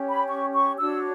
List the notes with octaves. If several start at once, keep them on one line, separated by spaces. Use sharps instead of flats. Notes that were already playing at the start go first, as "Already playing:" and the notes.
Already playing: C#4 G4 C#5
B5
C#6
C#6
D4 F#4 C#5 E6